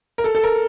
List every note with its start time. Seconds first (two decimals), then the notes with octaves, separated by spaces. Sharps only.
0.18 A#4
0.24 A4
0.35 A4
0.43 A#4